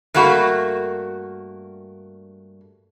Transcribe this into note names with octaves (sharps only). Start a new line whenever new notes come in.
G2 A3 A#3 F#4